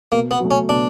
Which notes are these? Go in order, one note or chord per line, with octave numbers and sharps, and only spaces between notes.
B2 A#3
B3
F#3 A3
C#4
B2 D4